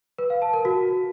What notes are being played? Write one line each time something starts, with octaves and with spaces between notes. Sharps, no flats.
B4
F5
A5
A#4
F#4